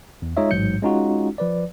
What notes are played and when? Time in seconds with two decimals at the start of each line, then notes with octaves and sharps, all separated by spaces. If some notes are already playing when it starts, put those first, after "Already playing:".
0.22 E2
0.37 G#3 D#4 F4 C#5 D#5 E5
0.51 A1 G#2 F#3 G6 C#7
0.82 G#3 C#4 D#4 F4 F#4
1.38 F3 B4 D5